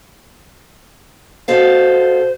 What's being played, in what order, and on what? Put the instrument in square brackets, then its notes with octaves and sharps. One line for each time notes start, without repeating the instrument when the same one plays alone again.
[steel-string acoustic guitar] B2 A4 F5 [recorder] C5